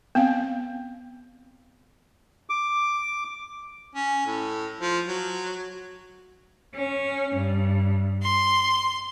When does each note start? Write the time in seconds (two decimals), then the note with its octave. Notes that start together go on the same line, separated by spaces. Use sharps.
0.15 B3 C4 F5
2.50 D6
3.95 C#4
4.27 A2
4.81 F3
5.08 F#3
6.74 C#4
7.37 G2
8.23 C6